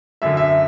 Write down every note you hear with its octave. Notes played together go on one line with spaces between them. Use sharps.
F#2 D3 E5
E5